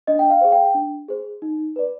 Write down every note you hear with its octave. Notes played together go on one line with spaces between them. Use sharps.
D4 D#5
G5
F5
G#4 C5
G5
D4
G#4 C5
D#4
B4 D5